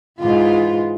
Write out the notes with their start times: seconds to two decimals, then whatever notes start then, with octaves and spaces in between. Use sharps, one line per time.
0.19 G#2 E3 F4